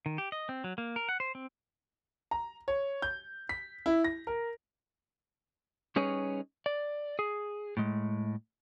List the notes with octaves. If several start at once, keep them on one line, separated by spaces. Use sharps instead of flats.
D#3
G4
D#5
C4
F#3
A#3
A#4
F#5
C5
C4
A#5
C#5
G6
B6
E4
A#6
A#4
G3 C#4 D#4 G#4 B4 C#5
D5
G#4
A2 G#3